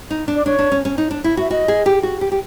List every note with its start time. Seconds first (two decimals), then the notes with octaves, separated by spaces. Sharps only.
0.11 D#4
0.28 D4
0.35 D5
0.46 D4 C#5
0.59 D4
0.72 C#4
0.85 C#4
0.98 D#4
1.11 D4
1.24 E4
1.37 F#4 E5
1.51 F#4 D#5
1.68 G#4
1.86 G4
2.03 F#4
2.21 G4
2.32 G4